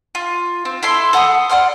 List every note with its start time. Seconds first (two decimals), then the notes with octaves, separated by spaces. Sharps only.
0.15 F4
0.65 C4
0.83 E4 A4 C6
1.13 A4 F#5 B5 D#6
1.50 D5 F#5 C6 F6